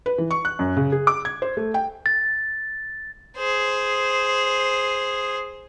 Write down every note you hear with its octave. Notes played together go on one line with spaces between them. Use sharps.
B4
E3
C#6
F#6
F#2
C#3
G#4
D6
G#6
C5
A3
G5
A6
G#4 C5